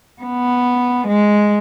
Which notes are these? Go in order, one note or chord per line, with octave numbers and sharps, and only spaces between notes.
B3
G#3